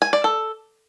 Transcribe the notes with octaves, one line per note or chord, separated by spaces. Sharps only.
G#5
D5
A4